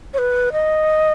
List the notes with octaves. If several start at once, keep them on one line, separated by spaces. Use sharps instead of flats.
C#5
B4
D#5